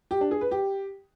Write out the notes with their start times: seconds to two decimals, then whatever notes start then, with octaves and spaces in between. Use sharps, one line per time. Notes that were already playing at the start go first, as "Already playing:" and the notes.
0.11 G4
0.21 D4
0.31 G#4
0.41 B4
0.51 G4